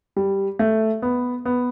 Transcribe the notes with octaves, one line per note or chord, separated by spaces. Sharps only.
G3
A3
B3
B3